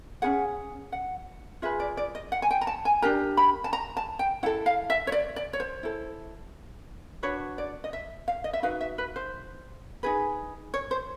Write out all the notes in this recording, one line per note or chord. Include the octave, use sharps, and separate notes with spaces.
C#4 F4 G#4 F#5
F#5
F4 G#4 B4 E5
D5
D5
D#5
F#5
G#5
G5
A#5
A5
G#5
D4 G4 A#4 A#5
B5
A5
A#5
A5
G5
E4 A4 F#5
F5
E5
C#5
D5
D5
C#5
C5
E4 A4
D4 F#4 B4 C#5
D5
D#5
E5
F5
D#5
E5
D#4 F#4 B4 F5
E5
B4
C5
D#4 G#4 B4
C#5
C5